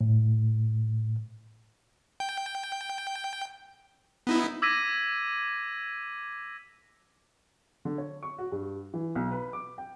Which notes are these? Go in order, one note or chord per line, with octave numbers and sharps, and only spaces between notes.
A2
G5
B3 D#4 E4
D6 E6 G#6 A#6 B6 D#7
D3
C#5
C#6
F#4
G2
E3
B1
B4
D6
G5